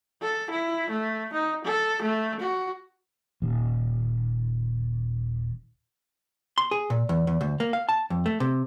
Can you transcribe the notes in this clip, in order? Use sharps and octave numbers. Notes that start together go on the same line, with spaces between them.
A4
E4
A3
D#4
A4
A3
F#4
D#1 D#2
C6
G#4
A#2
E2
E2
D2
A#3
F5
A5
F2
A3
C3